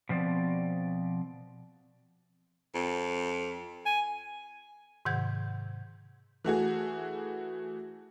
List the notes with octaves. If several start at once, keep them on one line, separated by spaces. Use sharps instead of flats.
B2 F3 C4 D5
F2
G#5
G#2 C3 D#3 F#5 G6 G#6
E3 A3 F#4 G#4